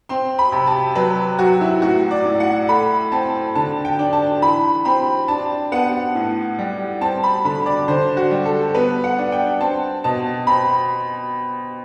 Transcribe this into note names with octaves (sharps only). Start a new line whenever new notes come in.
C4 C6
B5
C3
A5
F#3 B4
F#3 F#4
E4
A2 F#4
D5
A2
F#5
A3 B5
C4 A5
D3 A5
G5
D4
A5
E3 B5
C4 B5
D4 A5
B3 F#5
A2
G3
C4 A5
B5
D3 B5
D5
D3 C5
F#4
G3
A4
B3 B4
F#5
D4
G5
C4 A5
B2 A5
C4 B5